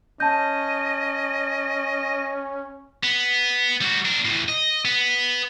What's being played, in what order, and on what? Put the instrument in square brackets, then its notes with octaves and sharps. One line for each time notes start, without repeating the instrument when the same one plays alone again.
[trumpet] C#4 [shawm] D#5 [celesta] A5 G6
[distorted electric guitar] B3
G3 F#4
D4 A#4
E2 A2
D#5
B3